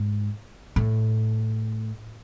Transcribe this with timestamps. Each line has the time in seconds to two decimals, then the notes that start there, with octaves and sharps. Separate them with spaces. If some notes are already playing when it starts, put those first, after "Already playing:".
Already playing: G#2
0.76 A2